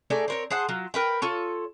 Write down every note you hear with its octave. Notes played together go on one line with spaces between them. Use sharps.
A3 D#4 G#4 D5
C4 A#4 C#5
G#4 C5 F#5 A5
F#3 F4
A#4 B4 G5
F4 A4 C#5